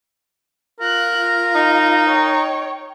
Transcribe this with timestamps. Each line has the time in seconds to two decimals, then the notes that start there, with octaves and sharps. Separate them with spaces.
0.80 F4 A#4 F#6
1.18 F4
1.55 D#4
2.09 C#5 G5